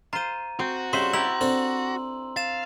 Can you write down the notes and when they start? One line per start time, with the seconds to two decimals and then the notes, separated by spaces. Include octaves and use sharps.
0.13 F4 C5 A#5 D#7
0.59 C4 F#4
0.93 C#3 G3 C5 E5 C6
1.13 E4 G4 A5 A#5 E6 F#7
1.41 C4 D4 A4
2.36 F5 A6 E7